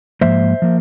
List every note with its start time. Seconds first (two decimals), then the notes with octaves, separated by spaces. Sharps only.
0.21 G#2 F3 A#3 C5 E5
0.62 F3 A#3